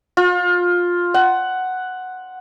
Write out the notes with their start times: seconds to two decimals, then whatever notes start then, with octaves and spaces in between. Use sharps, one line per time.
0.17 F4
1.14 F#5